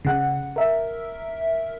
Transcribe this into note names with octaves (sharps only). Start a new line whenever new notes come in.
C#3 F#5
A#4 E5